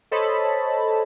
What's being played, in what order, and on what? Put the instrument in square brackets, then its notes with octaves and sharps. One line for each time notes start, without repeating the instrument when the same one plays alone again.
[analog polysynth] A4 C5 C#5 D#5 A5 B5